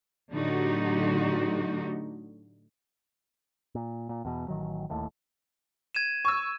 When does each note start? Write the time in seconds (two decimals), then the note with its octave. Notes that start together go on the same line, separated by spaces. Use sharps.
0.32 A2 D3 F#3 D#4 F#4 G4
3.75 A#2
4.09 A#2
4.25 E2 B2
4.48 A1 D#3 F#3
4.89 D1 D#2 A2 A3
5.95 G#6 D#7 E7
6.25 C#6 E6